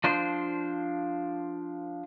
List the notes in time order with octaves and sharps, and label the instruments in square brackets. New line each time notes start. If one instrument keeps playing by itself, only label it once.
[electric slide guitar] F3 D4 C5